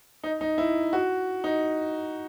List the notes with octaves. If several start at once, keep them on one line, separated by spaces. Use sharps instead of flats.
D#4
D#4
E4
F#4
D#4